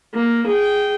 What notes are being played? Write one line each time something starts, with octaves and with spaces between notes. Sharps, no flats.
A#3
G#4 G5